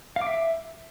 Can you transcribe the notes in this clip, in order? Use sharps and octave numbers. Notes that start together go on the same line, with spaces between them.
F5
D6
E5